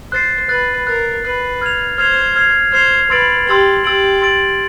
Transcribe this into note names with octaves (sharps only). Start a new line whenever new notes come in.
C5 F#6 A6 C7
B4 F#6 A6 C7
A#4 F#6 A6 C7
B4 F#6 A6 C7
F6 G#6 C7 F7
C5 F6 G#6 C7 F7
F6 G#6 C7 F7
C5 F6 G#6 C7 F7
B4 C6 E6 A6 D7 F#7
G4 C6 E6 A6 D7 F#7
G4 C6 E6 A6 D7 F#7
C6 E6 A6 D7 F#7